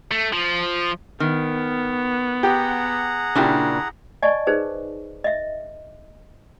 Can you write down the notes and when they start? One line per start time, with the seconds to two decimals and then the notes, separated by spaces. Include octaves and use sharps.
0.11 A3
0.33 F3
1.20 D#3 B3
2.43 G4 G#4 F#5 A#5
3.36 A#2 C#3 D4 E4 G4
4.23 D5 D#5 G#5 A5 C#6
4.47 D#4 G#4 B4 C5
5.24 D#5 E5